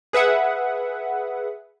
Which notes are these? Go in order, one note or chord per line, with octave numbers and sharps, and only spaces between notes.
G#4 B4 E5 F#5